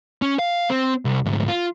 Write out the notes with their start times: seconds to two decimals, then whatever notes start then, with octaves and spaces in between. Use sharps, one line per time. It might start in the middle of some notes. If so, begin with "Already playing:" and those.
0.22 C#4
0.39 F5
0.70 C4
1.05 C2
1.25 D2 G#2
1.48 F4